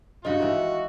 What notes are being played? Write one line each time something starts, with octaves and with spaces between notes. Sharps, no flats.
G2 C#3 F#4 D#5 F5
G#2 D#3 E3